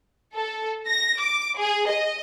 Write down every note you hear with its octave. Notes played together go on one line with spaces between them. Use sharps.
A4
A#6
D6
G#4
D#5